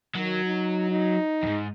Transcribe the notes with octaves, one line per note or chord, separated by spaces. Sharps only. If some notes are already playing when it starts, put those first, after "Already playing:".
D#3 F#3
D#4
D#4
F2 G#2